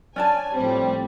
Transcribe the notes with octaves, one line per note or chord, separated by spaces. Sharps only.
C#4 D4 G#5 A5
A2 F3 G3 C4